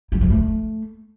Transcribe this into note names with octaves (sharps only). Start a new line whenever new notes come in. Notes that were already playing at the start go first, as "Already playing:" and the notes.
F#3
F3
A3